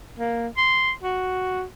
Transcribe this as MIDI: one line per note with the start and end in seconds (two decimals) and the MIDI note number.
0.19 0.47 58
0.57 0.91 84
1.03 1.63 66